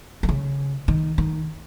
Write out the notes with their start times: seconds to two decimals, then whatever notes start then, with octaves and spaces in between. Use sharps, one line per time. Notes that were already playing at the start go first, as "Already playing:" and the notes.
0.23 D#3
0.29 C#3
0.88 D#3
1.18 D#3